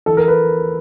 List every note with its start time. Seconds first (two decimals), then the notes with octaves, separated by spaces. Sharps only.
0.06 E3 A4
0.17 A#4
0.28 B4